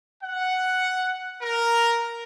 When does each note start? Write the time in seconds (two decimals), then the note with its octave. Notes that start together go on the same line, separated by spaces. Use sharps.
0.23 F#5
1.42 A#4